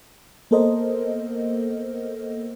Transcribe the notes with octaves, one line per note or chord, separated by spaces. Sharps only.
A#3 B3 A4 A#4 C5 D#5